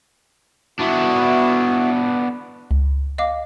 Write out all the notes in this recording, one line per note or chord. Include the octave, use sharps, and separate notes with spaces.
B3 D4 E4 F#4
C#2
D#5 F5 D6